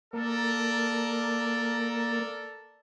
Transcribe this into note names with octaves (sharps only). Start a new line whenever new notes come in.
A#3 A4 A#4 D5